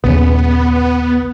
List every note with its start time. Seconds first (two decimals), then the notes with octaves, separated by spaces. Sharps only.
0.04 A#1 D#2 C#3 B3